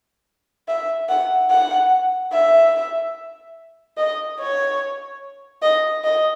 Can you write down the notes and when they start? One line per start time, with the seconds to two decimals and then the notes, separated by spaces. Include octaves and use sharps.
0.68 E5
1.09 F#5
1.50 F#5
2.33 E5
3.98 D#5
4.39 C#5
5.62 D#5
6.04 D#5